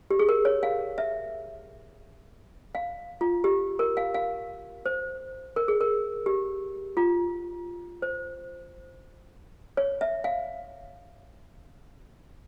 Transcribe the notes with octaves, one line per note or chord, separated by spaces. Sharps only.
G4
G#4
A#4
C#5
F5
E5
F5
F4
G4
A#4
F5
F5
C5
A#4
G#4
A#4
G4
F4
C5
C#5
E5
F5